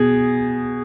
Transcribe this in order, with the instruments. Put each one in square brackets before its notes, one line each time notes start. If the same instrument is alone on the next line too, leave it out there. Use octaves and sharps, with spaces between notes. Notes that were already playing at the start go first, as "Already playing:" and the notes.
Already playing: [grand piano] B2 G#4